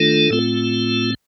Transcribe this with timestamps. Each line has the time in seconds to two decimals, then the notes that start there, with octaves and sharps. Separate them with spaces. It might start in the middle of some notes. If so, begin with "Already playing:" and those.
Already playing: D#3 A3 D4 F4 A4
0.30 A2 A3 C4 F4